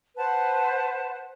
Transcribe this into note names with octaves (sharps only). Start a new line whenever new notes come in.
B4 C5 F#5 A5